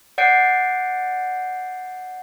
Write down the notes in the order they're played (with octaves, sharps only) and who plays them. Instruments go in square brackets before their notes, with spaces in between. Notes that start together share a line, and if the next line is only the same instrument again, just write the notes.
[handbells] D5 F#5 G6 C7 D7